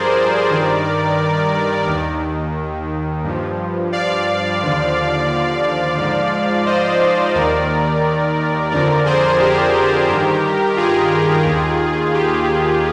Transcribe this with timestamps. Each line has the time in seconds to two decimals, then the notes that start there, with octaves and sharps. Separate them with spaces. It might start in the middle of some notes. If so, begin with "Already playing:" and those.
Already playing: G2 F3 G#4 A#4 C5 D5
0.50 G2 D#3
1.87 D#2 D#3
3.24 G2 F3
3.92 D5 F5
4.61 D#2 D3 F3
5.98 G#2 F3
6.66 C5 D#5
7.34 D#2 D#3 A#4 D5
8.71 F2 D3 F3 A#4 D5
9.05 G#4 C5
9.40 G4 A#4
10.09 G2 D#3
10.77 F4 G#4
11.45 D#2 D#3
12.14 G4